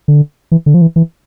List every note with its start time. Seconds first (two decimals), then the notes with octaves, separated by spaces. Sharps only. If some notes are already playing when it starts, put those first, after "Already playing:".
0.08 D3
0.52 E3
0.66 D3
0.74 F3
0.81 E3
0.96 E3